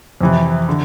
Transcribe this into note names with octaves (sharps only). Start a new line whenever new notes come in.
F2 C3 E3
D3